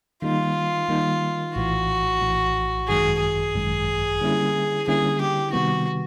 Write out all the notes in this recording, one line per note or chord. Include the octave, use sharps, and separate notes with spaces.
D#3 G3 A#3 D#4 F4
D#3 G3 A#3 D#4
A#1 A2 E3 F#4
A#1 A2 E3
G#1 F#2 D#3 G#3 G#4
G#4
G#1 F#2 D#3 G#3
D3 G3 A#3 C#4 E4
D3 G3 A#3 C#4 E4 G#4
G4
C3 D#3 G3 B3 F#4